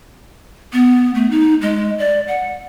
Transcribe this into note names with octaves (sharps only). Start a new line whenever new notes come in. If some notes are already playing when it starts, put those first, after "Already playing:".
B3
A3
D#4
G#3
D5
F#5